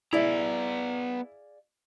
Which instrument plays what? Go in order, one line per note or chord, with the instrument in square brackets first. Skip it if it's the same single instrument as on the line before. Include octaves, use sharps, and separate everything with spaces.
[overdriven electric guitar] B3 A#5 [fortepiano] E4 [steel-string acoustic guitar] G#4 D5 F5